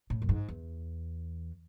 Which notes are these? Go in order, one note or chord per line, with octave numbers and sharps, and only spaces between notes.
A2
F#2
G#2
E2